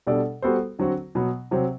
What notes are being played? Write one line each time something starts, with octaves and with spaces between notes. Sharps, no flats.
B2 G3 D4 A4 D5
G3 B3 F#4 A4 C5
D3 F#3 C4 F#4
B2 F#3 B3
C3 F#3 C4